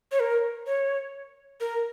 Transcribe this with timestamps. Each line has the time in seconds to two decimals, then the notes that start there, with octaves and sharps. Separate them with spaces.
0.12 C#5
0.20 A#4
0.67 C#5
1.60 A#4